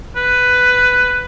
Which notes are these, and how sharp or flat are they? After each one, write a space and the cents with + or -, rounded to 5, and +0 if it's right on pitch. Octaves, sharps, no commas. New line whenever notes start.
B4 +10